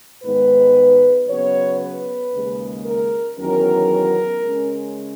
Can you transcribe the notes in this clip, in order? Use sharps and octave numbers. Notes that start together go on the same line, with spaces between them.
G#2 D#3 G#3 B3 B4
C#3 F#3 B3 C#5
B4
D#2 C#3 G#3
A#4
E2 D#3 F#3 C#4 A#4
C#3 G#3 C#4